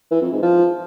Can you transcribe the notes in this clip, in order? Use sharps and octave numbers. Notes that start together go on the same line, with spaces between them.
E3
F2
G#2
F3